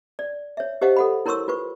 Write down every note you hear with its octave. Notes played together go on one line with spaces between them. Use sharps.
D5
C#5 E5
G4 C5 D#5 F5 F#5
A4 F#5 B5
E4 A#4 C#5 C6 C#6 E6
F4 B4 C#6